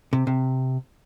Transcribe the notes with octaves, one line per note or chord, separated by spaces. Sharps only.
C3
C3